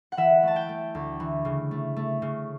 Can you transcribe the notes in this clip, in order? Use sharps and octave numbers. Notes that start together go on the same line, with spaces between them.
F#5
E3 E5
A3 A5
G5
A3
D2
E3
C#3
A3
A3
C#3